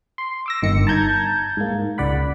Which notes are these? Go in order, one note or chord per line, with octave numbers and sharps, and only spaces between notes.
C6
D6 E6 A#6
G1 D#3 C#7
A5 A#5 G6 G#6
G#2 A#3
C#2 D5 F#5 B5